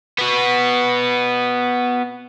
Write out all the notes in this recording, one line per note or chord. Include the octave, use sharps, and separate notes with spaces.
B3 F#4